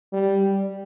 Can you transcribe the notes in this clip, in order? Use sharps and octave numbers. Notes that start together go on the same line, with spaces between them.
G3